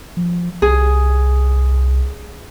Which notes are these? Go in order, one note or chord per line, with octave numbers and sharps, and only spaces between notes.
F3
C2 G#4